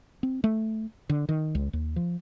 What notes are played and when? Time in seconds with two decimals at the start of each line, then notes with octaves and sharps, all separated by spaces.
0.23 C4
0.44 A3
1.09 D3
1.29 D#3
1.55 C#2
1.73 D#2
1.96 F3